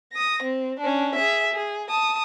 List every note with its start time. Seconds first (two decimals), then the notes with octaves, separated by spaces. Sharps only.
0.12 D#6 A#6
0.43 C4
0.80 C#4 D4
1.16 G#4 E5
1.54 G#4
1.90 A5 D#6